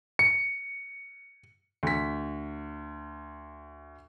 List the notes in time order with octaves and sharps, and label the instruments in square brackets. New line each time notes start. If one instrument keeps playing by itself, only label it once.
[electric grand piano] C#7
[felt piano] D2 B6